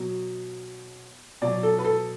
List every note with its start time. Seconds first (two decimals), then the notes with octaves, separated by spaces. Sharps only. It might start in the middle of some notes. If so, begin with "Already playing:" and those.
Already playing: B2 F#3
1.42 B2 F#3 D5
1.63 A4
1.79 B4
1.84 A4